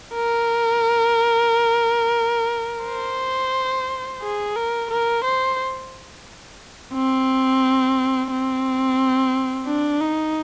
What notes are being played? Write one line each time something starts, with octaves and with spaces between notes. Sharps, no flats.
A#4
C5
G#4
A#4
A#4
C5
C4
C4
D4
D#4